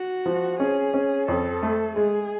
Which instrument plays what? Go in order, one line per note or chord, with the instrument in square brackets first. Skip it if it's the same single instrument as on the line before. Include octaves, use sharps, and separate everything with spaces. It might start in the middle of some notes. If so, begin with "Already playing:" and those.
Already playing: [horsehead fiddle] F#4
[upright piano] F3
[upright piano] C#4 [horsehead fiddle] G#4
[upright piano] C#4
[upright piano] F2 [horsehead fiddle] A4
[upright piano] A3
[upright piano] G#3 [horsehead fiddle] G#4